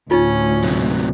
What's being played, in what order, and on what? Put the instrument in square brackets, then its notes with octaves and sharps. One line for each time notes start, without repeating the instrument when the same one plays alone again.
[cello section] D2 A2 [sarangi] C#4 [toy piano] D#4 F4
[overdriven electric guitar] C3 F#3